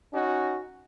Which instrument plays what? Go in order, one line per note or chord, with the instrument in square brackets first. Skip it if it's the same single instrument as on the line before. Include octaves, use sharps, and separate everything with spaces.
[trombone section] C#4 D#4 F#4